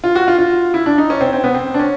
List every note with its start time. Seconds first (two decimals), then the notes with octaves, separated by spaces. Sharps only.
0.04 F4
0.15 F#4
0.28 F4
0.38 F4
0.74 E4
0.86 D4
0.98 D#4
1.10 C#4
1.21 C4
1.33 C4
1.44 B3
1.55 C4
1.74 D4
1.79 C#4